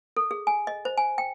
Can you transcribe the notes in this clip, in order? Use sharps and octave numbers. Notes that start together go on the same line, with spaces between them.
A4
G#4
G#5
D#5
C5
G#5
G5